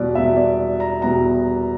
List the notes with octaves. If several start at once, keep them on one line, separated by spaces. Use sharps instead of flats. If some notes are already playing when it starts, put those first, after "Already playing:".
Already playing: E2 B2 G3 B3 D5
E2 B2 G3 B3 E5
D5
A#5
E2 B2 G3 B3 A#5